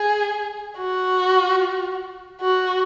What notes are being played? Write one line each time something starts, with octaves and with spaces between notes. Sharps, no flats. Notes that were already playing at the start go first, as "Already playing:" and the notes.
Already playing: G#4
F#4
F#4